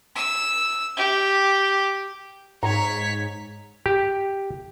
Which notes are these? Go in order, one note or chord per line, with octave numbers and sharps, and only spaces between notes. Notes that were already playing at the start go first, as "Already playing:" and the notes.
E6
G4
G#2 C#5 A#5 B6
G4